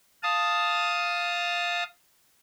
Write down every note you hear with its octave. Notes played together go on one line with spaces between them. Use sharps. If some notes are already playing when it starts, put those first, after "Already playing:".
F5 A5 D#6